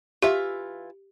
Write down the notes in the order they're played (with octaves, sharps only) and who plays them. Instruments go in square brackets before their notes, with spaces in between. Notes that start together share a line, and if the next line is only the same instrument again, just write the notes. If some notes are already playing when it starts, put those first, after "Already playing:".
[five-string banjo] E3 F4 E5 [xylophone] G4